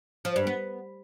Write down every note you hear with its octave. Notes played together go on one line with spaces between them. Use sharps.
F3
G2
B3